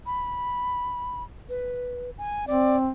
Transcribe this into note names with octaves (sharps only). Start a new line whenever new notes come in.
B5
B4
G#5
C4 D5